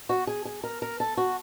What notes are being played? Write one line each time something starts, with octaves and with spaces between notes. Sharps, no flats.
F#4
G#4
G#4
A#4
A#4
A4
F#4